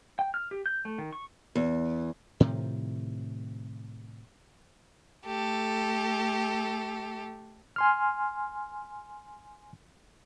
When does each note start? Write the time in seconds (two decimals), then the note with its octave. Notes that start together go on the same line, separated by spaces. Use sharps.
0.19 G5
0.34 F6
0.51 G4
0.66 G6
0.85 A3
0.98 D#3
1.13 C#6
1.55 E2
2.40 A2 C3 D#3 F3
5.26 A3 G4 A4
7.76 G#5 C6 F6